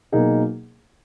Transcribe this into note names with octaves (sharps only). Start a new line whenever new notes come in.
B2 F#3 A#3 D#4 G#4